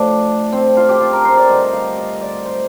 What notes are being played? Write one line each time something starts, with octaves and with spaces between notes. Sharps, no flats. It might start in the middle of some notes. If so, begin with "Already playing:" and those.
Already playing: A2 F3 A3 D4
C4
F4
G4
F4
A#4
C5
D5
G2 D3 A3 D#5
F5
D#5
D5
C5